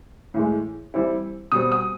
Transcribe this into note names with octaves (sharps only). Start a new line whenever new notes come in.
A2 E3 G#3
E3 G3 C4 E4
B2 G3 C4 D#6
D#6